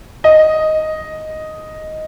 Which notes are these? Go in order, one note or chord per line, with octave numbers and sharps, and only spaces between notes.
D#5